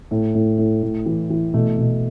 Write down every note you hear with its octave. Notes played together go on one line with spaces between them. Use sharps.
A2
A2
A2
A2
E3
E3
B2 A3
B2